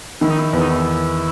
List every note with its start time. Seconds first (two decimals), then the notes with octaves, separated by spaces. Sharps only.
0.21 D#3 E4
0.30 D#4
0.38 E4
0.53 E2
0.61 D#4
0.68 E4